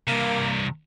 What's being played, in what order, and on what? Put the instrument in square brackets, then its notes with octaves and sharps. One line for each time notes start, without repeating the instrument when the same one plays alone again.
[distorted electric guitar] G2 C3 [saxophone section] A#3